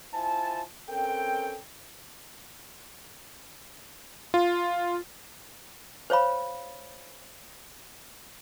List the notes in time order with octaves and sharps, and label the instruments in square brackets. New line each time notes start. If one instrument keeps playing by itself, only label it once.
[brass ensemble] E4 F4 C5 G#5 A5
C4 C#4 A4 A#4 G5
[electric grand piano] F4
[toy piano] C5 C#5 F5 B5